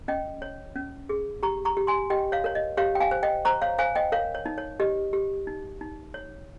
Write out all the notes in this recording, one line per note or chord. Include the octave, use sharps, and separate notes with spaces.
C#4 D#5 G5
C#5
C#4
G#4
G4 A#5 C#6
A#5 C#6
G4
G#5 C6
G4 D#5 G5
C#5 F5
A#4 C#5
D#5
G4 C#5 F5
G5
F5 G#5
C5
D#5 G5
C5 A#5 C#6
C#5 F5
C5 F5 G#5
D#5 G5
A#4 C#5 F5
C#5
D#4
C#5
G4 D#5
G4
D#4
D#4
C#5